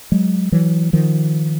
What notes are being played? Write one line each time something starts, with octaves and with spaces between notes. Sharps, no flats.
F#3 G#3
E3 F#3
D#3 F3